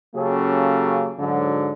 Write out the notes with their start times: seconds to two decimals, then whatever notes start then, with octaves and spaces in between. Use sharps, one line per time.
0.15 C#3 F#3 A#3 C#4 G4 A4
1.19 G#2 D3 F#3